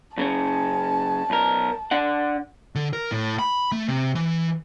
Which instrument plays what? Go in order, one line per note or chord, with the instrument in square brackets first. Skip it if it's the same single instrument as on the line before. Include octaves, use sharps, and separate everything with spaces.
[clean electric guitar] F#2 C#3 C#4 [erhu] A5
[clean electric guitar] B1 A#4
D4 F#5
[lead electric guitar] D3
A#4
A2
B5
A3
C3
E3